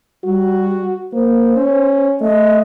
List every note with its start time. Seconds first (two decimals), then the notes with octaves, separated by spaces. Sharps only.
0.24 G3 F#4
1.13 A#3 C5
1.56 C#4
2.21 A3 D#5